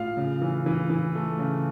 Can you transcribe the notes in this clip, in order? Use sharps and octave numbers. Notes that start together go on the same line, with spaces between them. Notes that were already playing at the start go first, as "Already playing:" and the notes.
Already playing: A2 F4 F5
C#3
E3
E3
E3
A3
C#3